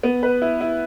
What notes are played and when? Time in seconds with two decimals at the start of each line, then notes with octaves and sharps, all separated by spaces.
0.03 B3
0.23 B4
0.42 E4
0.61 E4